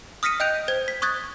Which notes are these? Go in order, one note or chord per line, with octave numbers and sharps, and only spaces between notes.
D#6 F6 A#6 B6 C#7 D#7
D#5 G5 F#6 G6 D7 F7
C5 G#6
B6
C#6 D#6 F#6 G#6 A6